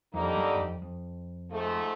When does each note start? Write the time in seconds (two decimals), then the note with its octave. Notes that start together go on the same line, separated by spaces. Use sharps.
0.14 F2 D3 G3 A#3 D#4
0.37 F#2
0.59 F2
0.82 F2
1.50 G#2 F3 A3